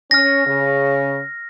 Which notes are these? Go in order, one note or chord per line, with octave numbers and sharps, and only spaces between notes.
C#4 F6 A#6
C#3